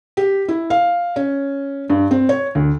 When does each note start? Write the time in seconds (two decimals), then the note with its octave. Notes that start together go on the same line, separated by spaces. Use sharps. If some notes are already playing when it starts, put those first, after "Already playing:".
0.17 G4
0.48 E4
0.70 F5
1.16 C#4
1.90 G2
2.11 C4
2.29 C#5
2.55 D2